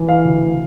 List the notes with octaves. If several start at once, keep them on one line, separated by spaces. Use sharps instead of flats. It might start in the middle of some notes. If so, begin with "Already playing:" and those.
Already playing: E3
F5
D2